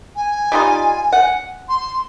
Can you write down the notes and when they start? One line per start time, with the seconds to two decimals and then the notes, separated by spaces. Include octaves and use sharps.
0.16 G#5
0.52 G3 D#4 F4
1.12 F#5
1.69 C6